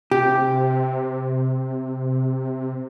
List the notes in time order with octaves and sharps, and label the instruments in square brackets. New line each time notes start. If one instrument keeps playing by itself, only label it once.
[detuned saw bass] C3 [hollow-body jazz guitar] G4